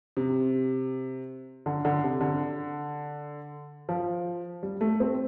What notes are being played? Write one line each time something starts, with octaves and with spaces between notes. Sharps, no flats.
C3
D3
D3
C3
D3
F3
G3
A3
C4